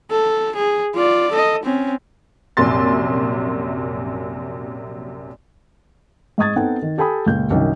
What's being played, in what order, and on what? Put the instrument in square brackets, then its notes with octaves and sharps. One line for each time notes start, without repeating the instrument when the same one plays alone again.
[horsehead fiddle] A4
G#4
F4 D5
A4 D#5
C4 C#4
[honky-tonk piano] A#1 F#2 C3 C6 A6
[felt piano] G#2 D#5 C#6 D#6 G#6 A6
B3 C4 D#4 A4 F#5 G5
D#3
G4 A4 G5 G#5 B5 D#6
C#2 A#2 G6
C2 F#2 D#3